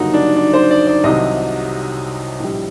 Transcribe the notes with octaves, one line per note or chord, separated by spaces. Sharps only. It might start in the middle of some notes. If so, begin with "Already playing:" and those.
Already playing: F#1 F#2 D3 G3 A#3 D#4 F#4
D4
D4
C5
D5
D5
C2 C3 D#3 F#3 D#5
A#1 A2 G3